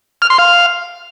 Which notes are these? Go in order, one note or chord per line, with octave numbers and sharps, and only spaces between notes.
F6
C6
F5